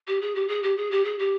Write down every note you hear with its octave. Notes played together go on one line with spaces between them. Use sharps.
G4
G#4
G4
G#4
G4
G#4
G4
G#4
G4